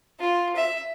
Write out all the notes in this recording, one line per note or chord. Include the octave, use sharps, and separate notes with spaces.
F4
E5